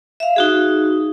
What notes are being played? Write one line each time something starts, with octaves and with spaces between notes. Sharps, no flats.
E5 F5
D#4 F#4 G#4